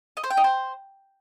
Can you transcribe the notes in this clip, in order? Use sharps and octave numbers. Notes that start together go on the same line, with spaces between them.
D#5
C5
G5
D#5
C5